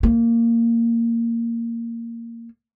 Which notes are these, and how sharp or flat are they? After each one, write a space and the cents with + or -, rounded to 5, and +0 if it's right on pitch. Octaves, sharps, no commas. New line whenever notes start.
A#3 -10